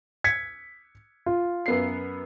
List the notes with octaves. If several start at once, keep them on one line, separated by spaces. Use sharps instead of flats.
G#6 B6 C#7
F4
F#2 B3 C7